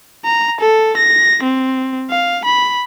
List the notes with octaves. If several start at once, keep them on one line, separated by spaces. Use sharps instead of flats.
A#5
A4
A#6
C4
F5
B5